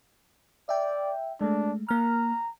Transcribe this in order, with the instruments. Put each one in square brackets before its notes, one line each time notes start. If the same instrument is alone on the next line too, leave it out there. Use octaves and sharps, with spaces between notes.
[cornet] D5 [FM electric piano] E5 G5
[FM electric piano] G#3 A3 [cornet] D4
[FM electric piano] A#3 F6 [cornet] A#5